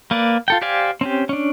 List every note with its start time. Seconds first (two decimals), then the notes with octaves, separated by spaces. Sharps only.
0.11 A#3 B4 D5
0.48 F4 A4 G5
0.62 G4 C5 D5 F5 G#5
1.01 C4 C#4 G4
1.29 C#4 D4